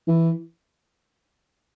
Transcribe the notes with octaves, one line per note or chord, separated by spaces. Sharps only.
E3